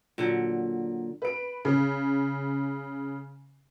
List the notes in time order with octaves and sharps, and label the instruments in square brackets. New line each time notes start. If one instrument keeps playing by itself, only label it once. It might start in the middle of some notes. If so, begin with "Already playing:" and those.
[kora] A#2 D3 F#3
[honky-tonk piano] B4 D7
C#3